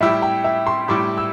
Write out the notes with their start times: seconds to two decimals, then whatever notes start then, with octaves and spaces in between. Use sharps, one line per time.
0.01 A2 G3 E4 G4 E5
0.22 G5
0.44 E5
0.67 C6
0.88 A2 G3 E4 G4 D6
1.18 E6